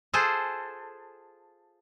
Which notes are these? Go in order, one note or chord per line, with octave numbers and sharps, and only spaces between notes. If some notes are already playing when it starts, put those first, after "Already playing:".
F4 G#4 A4 C5